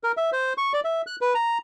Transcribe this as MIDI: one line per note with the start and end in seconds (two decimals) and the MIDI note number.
0.04 0.12 70
0.17 0.30 76
0.32 0.53 72
0.58 0.73 85
0.73 0.80 74
0.84 1.02 76
1.07 1.16 90
1.21 1.34 71
1.35 1.58 82